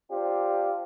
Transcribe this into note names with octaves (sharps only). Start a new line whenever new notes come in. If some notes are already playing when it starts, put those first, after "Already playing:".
C4 D4 F4 G4